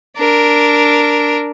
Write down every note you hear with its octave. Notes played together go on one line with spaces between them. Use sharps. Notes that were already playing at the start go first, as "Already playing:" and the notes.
D4 A#4